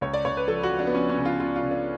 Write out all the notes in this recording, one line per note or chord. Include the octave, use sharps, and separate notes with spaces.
C#2 C#5
D5
C#2 C#5
B4
F3 A4
F#4
F3
D4
B3
F3 C#4
C#4
C#3
F4
C#2 F4
F4
C#3
D4